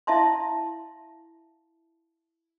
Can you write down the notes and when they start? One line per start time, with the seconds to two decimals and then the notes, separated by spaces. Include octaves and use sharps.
0.07 E4 E5 F5 A5 C6